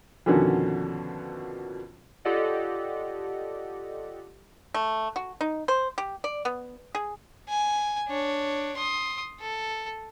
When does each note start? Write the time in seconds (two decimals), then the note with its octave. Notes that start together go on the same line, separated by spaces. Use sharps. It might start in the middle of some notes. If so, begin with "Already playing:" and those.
0.26 F2 B2 D3 D#3 C#4 F#4
2.25 F4 G4 A4 D5 D#5 F#5
4.74 A3
5.16 F#4
5.41 D#4
5.68 C5
5.98 G4
6.24 D5
6.45 B3
6.95 G#4
7.49 G#5
8.08 D4 C#5
8.77 C6 D#6
9.40 A4